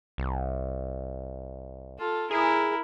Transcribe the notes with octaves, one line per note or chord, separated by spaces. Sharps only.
C2
F4 A4
E4 G#4 A#4